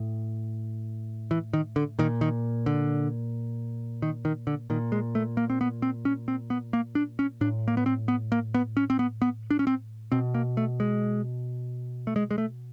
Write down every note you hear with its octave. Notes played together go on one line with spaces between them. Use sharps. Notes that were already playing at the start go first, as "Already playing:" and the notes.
Already playing: A2
E3
D#3
D3
A#2 D#3
D#3
D3
D#3
D#3
D3
A#2 D#3
G#3
A3
A#3
C4
B3
C4
C#4
C4
B3
A#3
D4
C#4
A2 D4
A#3
B3
C4
B3
A#3
B3
C#4
C4
B3
B3
D4
C#4
C4
B2 C4
A#3
A3
G#3
A3
G#3
G#3
A3